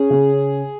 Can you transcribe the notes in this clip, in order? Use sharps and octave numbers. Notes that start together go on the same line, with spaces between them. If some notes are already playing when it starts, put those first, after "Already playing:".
Already playing: C#4 G#4
C#3